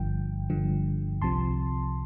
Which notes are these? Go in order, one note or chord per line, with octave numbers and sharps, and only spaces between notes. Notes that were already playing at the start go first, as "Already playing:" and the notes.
Already playing: G1 G2 D3 F3 G5
G1 G2 D3 F3
C2 C3 F3 A5 C6